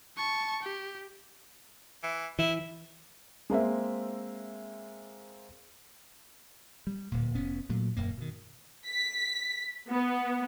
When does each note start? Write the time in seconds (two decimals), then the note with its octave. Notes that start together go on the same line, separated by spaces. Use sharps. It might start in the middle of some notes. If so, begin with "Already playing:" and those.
0.17 A5 C#6
0.62 G4
2.03 E3
2.39 E3 E4
3.50 G#3 A#3 C4 E5
6.87 G3
7.12 D1 A#2
7.35 F1 B3 C#4
7.69 A#2 F#3 A3
7.97 D#1 F#2 A#3
8.17 B2 D#3
8.86 B6
9.89 B3